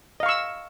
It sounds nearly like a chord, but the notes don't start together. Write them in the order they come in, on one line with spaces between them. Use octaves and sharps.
D#5 F5 C#6 E6